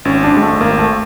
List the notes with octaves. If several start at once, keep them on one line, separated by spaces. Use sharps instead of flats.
G#1 C#4
D4
G#1 G#3
A3
G#1 A#3
A3